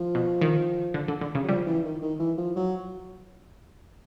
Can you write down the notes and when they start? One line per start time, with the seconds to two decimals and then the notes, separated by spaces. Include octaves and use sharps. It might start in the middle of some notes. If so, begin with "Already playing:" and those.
Already playing: F3
0.15 B2
0.41 D#3
0.94 D3
1.08 D3
1.21 D3
1.35 C#3
1.43 F#3
1.48 F3 G3
1.66 E3
1.84 D#3
2.02 D#3
2.19 E3
2.38 F3
2.56 F#3